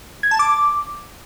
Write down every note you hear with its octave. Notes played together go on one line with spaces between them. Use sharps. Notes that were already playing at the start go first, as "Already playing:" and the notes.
G#6
A5
D6